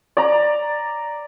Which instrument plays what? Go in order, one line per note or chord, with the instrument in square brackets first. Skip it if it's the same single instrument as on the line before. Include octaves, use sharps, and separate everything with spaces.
[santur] D5 A#5